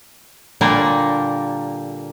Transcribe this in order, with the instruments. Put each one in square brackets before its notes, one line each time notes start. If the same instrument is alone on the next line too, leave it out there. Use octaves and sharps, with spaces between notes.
[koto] A#2 D3 G3 A#3 A#4